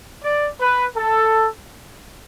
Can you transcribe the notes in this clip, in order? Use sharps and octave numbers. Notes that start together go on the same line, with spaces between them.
D5
B4
A4